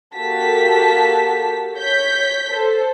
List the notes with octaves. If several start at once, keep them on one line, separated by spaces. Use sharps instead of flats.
A#3 F#4 G4 A4 A5 B6
C#5 G6 B6
A4 C5